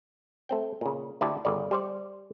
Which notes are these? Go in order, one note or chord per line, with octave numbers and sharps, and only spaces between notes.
A3 C4 G5
A#2 C#3
D2 E4 G4 D5 A5
G1 C#3 D5
G3 C5 D5